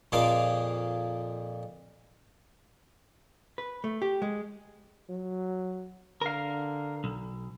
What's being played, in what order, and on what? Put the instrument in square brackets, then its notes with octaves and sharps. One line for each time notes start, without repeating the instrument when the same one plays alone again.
[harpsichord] F2 A#2 A#3 G#4 F5 D6
[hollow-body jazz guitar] B4
A3
G4
G#3
[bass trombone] F#3
[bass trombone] D3 [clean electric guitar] A#4 F5
[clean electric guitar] B1